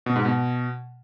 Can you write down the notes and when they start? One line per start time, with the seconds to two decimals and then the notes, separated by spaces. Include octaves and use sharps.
0.06 B2
0.16 G#2
0.25 B2